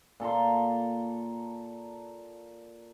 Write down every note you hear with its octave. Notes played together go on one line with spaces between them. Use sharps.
A#2 A4 A#5 C6